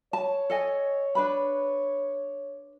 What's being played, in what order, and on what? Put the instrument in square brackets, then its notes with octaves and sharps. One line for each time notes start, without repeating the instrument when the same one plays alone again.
[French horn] C#5 [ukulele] A5
[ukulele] A4 D#5 G#5
D4 B4 B5